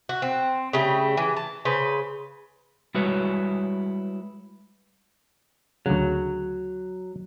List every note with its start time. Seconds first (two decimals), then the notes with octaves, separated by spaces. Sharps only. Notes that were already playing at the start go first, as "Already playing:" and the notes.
0.09 F#4
0.22 C4
0.73 C#3 G3 A3 G5
1.17 E3
1.36 A5
1.65 C#3 B4 C5
2.95 G3 G#3 E4 F#4 B4 C#5
5.86 D2 C#3 F#3